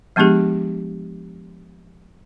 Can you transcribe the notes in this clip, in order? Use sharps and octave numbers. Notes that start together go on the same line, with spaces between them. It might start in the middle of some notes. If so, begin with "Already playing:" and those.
F3 G#3 B3 D4 G4 G#4